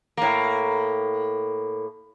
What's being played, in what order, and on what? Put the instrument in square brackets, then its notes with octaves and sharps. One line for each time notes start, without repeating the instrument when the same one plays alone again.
[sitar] A2 A#3